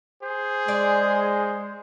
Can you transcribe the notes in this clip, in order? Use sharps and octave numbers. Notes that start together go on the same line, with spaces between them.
G#4 C5
G#3 D5